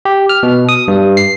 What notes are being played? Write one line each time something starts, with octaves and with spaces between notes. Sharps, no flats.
G4
F6
B2
D#6
G2
C7